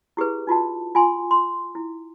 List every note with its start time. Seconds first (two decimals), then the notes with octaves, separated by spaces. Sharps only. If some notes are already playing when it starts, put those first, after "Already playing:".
0.17 E4 G4 G#4 B4
0.47 D#4 F4 F#4 A5
0.95 F4 G#5 C6
1.31 C6
1.75 E4